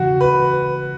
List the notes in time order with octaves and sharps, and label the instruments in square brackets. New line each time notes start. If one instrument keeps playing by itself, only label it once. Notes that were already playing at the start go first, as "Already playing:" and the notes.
Already playing: [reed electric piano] E2 C#3 E3 [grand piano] F#4
[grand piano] B4